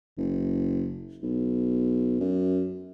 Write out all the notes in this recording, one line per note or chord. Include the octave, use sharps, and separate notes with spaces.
F#1
B1
F#2